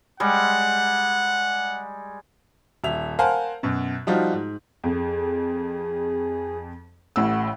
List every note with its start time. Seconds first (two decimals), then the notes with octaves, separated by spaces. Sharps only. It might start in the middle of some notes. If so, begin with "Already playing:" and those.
0.20 G3 G#3 F#5
2.84 D#1 E5 F7
3.19 A#4 C5 F5 F#5 G#5 A5
3.63 F#2 B2
4.07 F3 G3 D#4 F4 F#4
4.33 G#2
4.84 F2 G#4
7.16 A1 A2 F#5 E6